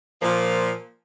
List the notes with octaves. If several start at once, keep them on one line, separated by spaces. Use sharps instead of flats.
A#2 F3